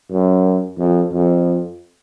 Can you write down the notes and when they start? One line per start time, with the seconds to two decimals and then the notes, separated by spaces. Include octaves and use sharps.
0.11 F#2
0.78 F2
1.12 F2